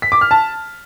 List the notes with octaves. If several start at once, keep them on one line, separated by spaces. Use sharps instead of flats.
B6
D6
F6
A5